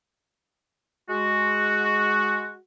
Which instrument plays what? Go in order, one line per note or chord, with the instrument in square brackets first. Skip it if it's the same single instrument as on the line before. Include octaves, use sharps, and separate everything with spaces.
[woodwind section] G#3 F#4